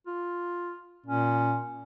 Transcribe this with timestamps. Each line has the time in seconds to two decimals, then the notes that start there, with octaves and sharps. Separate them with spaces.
0.07 F4
1.06 A#2 C#4